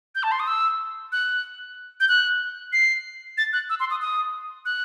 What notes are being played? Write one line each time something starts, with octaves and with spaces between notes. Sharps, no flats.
G6
A5
C6
D#6
E6
F#6
G6
F#6
C7
A6
F#6
E6
C6
D#6
D#6
F#6